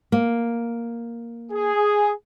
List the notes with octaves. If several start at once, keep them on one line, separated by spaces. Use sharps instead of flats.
A#3
G#4